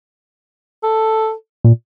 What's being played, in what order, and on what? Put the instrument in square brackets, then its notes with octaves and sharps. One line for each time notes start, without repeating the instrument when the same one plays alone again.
[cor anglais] A4
[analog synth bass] A#2